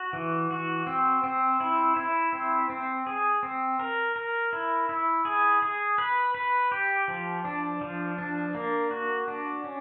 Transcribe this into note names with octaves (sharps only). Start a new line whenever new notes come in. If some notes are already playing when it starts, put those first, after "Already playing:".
Already playing: F#4
E3
F#4
C4
C4
E4
E4
C4
C4
G#4
C4
A#4
A#4
E4
E4
G#4
G#4
B4
B4
G4
F3
D4
F3
D4
A#3
F#4
D4
C#4